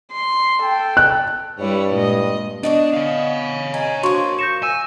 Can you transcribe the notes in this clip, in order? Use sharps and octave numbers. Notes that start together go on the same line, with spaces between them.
C6
A4 G5
F#6
G2 G3 E4 C#5
A#2 G#3 D#5
B3 D4 D#4 F#4 D5
C#5 F5
D#4 G#5
F3 A#3 D4 F#4 C6 C#6
C#6 G6 A#6 E7
G#5 E6